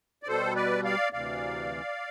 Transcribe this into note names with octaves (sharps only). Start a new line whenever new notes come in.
D5
B2 G3 A4 C5
B4 D5
D5 F5
D2 C3 E3 D5 F5